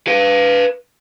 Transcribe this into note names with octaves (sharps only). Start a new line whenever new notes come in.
B4 F5